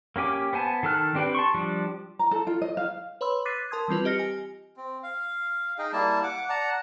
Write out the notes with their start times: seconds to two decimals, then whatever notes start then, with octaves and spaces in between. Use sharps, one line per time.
0.16 A#3 C#4 G4 G#5 D6
0.53 B3 C5 G#5 A5
0.83 D#3 A4 A5 F6 F#6
1.15 C4 D4 G4 B4 G5
1.35 A5 C6 C#6
1.54 F3 G3 D4
2.19 A#5
2.31 A4
2.47 F4
2.62 D#5
2.77 F5
3.21 B4 C#5 B5 C6 E6
3.45 D6 F#6 A6 B6 C7 D#7
3.71 A#4 A5 C6 D#6 G#6
3.88 E3 G3 C4 F4 B4
4.05 G4 D#5 F6 A#6 C#7
4.19 G#5
4.77 C4
5.03 F5
5.78 D#4 G#4 D#5 G5
5.93 G3 A#3 E4 A5
6.23 F#5 D6
6.49 D5 F#5 A5 A#5